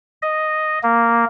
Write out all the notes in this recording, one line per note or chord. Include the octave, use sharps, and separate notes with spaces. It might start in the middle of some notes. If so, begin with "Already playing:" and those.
D#5
A#3